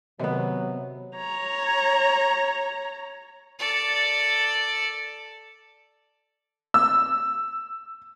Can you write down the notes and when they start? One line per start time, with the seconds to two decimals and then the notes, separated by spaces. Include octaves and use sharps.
0.19 C3 D#3 F#3 B3 C4 D#5
1.16 C#5 A#5
3.59 A4 D5
6.74 E6